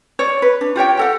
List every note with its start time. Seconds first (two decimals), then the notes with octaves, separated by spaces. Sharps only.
0.19 C#5 D5
0.42 B4
0.61 D4
0.76 F4 G4 C#5 G5
0.97 G4 A4 F#5